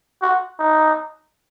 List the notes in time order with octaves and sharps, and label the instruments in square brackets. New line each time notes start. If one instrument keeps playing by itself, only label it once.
[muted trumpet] F#4
D#4